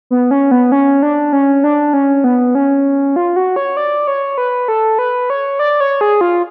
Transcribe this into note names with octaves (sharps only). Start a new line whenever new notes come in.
B3
C#4
B3
C#4
D4
C#4
D4
C#4
B3
C#4
F4
F#4
C#5
D5
C#5
B4
A4
B4
C#5
D5
C#5
G#4
F4